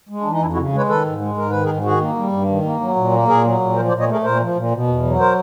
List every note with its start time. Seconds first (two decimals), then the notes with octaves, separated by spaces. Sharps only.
0.09 G#3
0.21 E3 D4
0.31 D#4
0.41 F2 D4 E4
0.53 E4 F#4
0.57 C#3
0.73 G#3 B4 C#5
0.89 D#3 A4 B4
1.05 G#2
1.21 G#3
1.37 G#2 A#4
1.50 D#3 B4
1.64 G#4 A#4
1.68 G#2
1.84 D#3 F#4 G#4
2.00 A#3
2.17 G3
2.32 G2
2.49 D#3
2.64 A#3
2.81 F#3
2.96 A#2
3.12 A#3
3.28 A#2 G#4 A#4
3.44 F#3
3.60 A#2
3.76 F3 A#4 C5
3.88 C5 D5
3.92 A#2
4.00 C#5 D#5
4.08 A3 G#4 A#4
4.24 A#2 A#4 C5
4.40 F3
4.55 A#2
4.71 B2
4.87 E2
5.03 F#3
5.19 A#4 C5